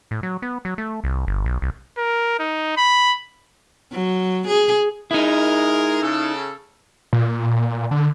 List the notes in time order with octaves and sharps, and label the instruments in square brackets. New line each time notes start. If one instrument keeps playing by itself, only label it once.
[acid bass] A2
F#3
B3
F#3
A3
C2
G1
B1
C2
[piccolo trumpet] A#4
D#4
B5
[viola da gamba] F#3
G#4
[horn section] G#3 G#4 A#4 [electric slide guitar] D#4 E4
[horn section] C#3 A4
[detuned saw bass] A#2
D3